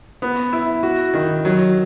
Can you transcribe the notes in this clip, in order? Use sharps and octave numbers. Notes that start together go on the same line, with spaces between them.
B3
E4
F#4
D#3
F#3